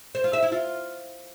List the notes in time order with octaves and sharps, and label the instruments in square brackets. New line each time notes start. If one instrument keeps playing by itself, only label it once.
[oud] C5
F4
E5
E4
F4